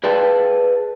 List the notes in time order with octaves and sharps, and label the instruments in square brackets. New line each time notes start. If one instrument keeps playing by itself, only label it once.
[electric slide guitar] G#4 B4 D5 F5 G5 A5